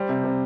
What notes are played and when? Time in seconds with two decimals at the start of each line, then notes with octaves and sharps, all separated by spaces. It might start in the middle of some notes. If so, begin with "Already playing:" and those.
Already playing: G3 C5
0.09 C3
0.24 C3